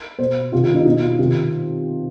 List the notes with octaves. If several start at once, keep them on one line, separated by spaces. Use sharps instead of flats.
B2 C5
C3 D#3 F4
F4
D#4
B2 D#4
F4
C3 D#3